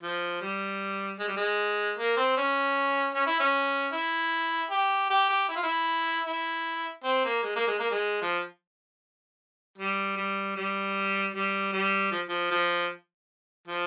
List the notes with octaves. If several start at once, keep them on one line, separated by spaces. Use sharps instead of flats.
F3
G3
G#3
G3
G#3
A#3
C4
C#4
C#4
E4
C#4
E4
G4
G4
G4
E4
F4
E4
E4
C4
A#3
G#3
A#3
G#3
A#3
G#3
F3
G3
G3
G3
G3
G3
F3
F3
F3
F3